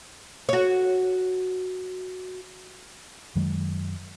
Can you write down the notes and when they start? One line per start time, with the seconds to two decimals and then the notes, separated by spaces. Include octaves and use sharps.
0.49 F#4 C#5
3.35 F#2 D#3 F#3 G#3